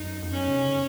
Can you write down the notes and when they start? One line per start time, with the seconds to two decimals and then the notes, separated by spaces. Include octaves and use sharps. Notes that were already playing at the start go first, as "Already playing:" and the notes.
Already playing: F#2 D#4
0.22 F2
0.31 F#2 C#4
0.48 C3
0.64 C#3